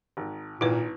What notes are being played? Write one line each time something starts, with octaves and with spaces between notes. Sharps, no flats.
G#1
G#1 A#2 E4 B4